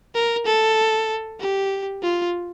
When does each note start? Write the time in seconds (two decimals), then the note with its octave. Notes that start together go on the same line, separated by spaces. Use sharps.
0.15 A#4
0.46 A4
1.40 G4
2.03 F4